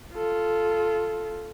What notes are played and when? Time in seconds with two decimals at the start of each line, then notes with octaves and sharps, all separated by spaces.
0.14 F4 A4